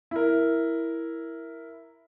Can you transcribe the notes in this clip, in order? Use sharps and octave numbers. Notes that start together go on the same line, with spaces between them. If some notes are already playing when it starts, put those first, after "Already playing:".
E4 A#4